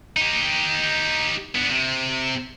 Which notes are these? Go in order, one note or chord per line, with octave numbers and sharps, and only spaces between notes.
D#4 G4
D3 B3
C3